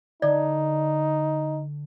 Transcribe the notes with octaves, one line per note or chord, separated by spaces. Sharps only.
D3 D#4 D5